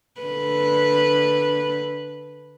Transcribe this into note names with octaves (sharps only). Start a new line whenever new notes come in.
D3 B4